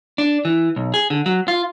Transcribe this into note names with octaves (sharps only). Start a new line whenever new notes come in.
D4
E3
B1
G#4
D3
F#3
F4